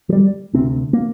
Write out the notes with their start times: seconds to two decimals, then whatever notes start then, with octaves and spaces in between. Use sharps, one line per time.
0.09 F3
0.13 G3
0.53 D2 C3 C4
0.93 A#3